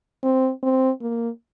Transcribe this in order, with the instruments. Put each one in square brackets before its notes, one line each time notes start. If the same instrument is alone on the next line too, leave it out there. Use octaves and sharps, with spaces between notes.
[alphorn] C4
C4
A#3